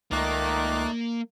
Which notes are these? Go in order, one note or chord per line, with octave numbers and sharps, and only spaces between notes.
C#2 D#3 A3 A#3 D#4 D5 D6 F#6